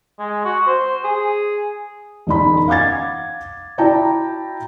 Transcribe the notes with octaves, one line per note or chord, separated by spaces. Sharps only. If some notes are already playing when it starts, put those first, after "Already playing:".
G#3
F#4
C5
G#4
E1 D#4 B5
F5 F#5 D6 G#6 A6
E4 F#4 D5 G5 A5 A#5